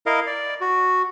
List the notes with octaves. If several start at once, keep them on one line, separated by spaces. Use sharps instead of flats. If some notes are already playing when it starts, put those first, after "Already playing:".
E4 A#4 D#5 F5
D5
F#4